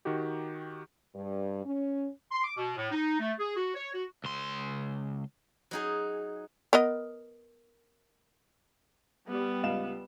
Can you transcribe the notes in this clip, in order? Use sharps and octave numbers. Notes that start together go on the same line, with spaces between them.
D#3 D#4 F#4 G4
G2
C#4
C6
D6
B2
A2
D#4
A3
G#4
F#4
C#5
F#4
C#2 C6
F#3 D#4 G#4
B3 A#4 D#5
G3 B3
C#2 F5 E7